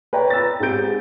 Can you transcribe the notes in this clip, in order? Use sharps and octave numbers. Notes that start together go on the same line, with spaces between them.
B4 C#5 D5 G5 A#5
E6 A6
G#2 G#3 C4 G4 G6 D7